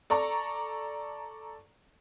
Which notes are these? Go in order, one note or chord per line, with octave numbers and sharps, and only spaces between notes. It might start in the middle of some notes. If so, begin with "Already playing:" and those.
A4 D5 A#5 C#6